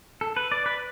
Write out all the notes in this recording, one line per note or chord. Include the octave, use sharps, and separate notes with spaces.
A4
B4
D5
B4